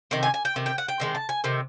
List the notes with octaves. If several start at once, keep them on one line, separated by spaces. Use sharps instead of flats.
C3 D#3
G#5
G#5
G5
C3 D#3
G5
F#5
G5
C3 D#3 G#3
A5
G#5
C3 D#3